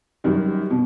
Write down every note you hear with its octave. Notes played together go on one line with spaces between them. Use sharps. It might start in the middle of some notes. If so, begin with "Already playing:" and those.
F#2 D#3 G3
B2